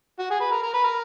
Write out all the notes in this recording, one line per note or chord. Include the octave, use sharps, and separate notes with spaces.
F#4
G#4
B4
A#4
A#4
B4
A#4